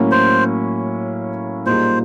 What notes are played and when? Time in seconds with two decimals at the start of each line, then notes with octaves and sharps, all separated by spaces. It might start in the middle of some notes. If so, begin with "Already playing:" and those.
Already playing: A2 F#3 A#3 C#4
0.12 C5
1.66 A#2 G3 A#3 D#4 G#4 C5